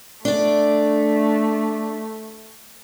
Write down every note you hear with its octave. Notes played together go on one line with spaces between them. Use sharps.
A3 D4 D5